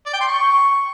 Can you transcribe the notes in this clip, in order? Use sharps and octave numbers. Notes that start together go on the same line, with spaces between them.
D5
G5
C6
C#6